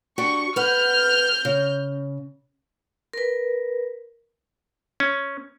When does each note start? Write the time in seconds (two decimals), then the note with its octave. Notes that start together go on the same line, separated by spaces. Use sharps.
0.18 D4 F#4 G4 C#6
0.56 B4 F#5 F6 G6
1.45 C#3
3.13 A#4 B4
5.00 C#4